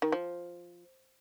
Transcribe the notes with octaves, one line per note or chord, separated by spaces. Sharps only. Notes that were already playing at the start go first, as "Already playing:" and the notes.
D#3
F3